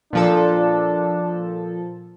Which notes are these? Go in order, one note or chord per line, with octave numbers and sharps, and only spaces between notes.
A#2 F3 D4 A4